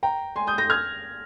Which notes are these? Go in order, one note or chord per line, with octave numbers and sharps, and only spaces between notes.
G5 A#5
G#5 C6
D#6 G6
G6 A#6
F6 G#6